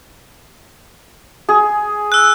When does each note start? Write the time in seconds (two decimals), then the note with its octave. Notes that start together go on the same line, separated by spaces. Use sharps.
1.49 G#4
2.12 E6 F#6